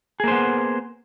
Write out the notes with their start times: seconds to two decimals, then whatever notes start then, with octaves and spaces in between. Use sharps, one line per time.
0.20 G#4
0.24 A#3
0.28 C5
0.32 B3